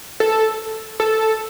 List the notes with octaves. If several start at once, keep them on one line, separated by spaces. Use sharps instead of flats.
A4
A4